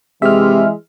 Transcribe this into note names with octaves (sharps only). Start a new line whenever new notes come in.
C3 E3 G#3 E5 F6